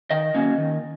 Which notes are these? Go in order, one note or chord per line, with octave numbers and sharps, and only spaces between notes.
D#3 D#5
F#3 A#3 C#4
D#3